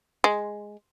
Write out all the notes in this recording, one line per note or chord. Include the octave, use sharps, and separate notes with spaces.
G#3